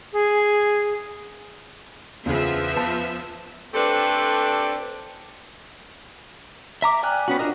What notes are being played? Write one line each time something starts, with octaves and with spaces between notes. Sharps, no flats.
G#4
E2 C#3 F3 B3 E5
B4 A5
A3 C4 D4 G4 A4 B4
E5 A#5 D6
D5 G5 G#5 F6 F#6
B3 C#4 F#4
D4 F4 F#4 A#4 D#5